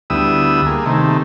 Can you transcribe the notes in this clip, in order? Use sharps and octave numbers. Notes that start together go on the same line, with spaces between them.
D2 G3 B3 E4 D#6 E6
A#3 G#4
C3 D#3 A3